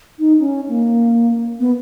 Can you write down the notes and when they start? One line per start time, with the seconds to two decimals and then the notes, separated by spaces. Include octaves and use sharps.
0.19 D#4
0.39 C#4
0.68 A#3
1.60 B3